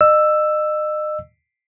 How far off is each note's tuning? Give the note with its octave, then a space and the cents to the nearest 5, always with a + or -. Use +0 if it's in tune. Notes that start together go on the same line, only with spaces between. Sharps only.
D#5 -35 E6 +5